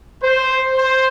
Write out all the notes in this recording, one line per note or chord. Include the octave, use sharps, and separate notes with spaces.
C5
C5